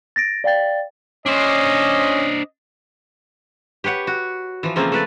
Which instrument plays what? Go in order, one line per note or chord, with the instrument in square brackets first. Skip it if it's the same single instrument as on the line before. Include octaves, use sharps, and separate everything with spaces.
[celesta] A6 A#6 D7
D5 F5 G5 A6
[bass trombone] C#4 [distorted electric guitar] D4 C5 [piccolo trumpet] D#5
[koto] G4 B4 C#5 F#5
F#4
E3 F3
C#3 F3 A3 A#3 C4
A3 B4 D5